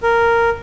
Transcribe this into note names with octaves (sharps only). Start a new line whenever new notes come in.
A#4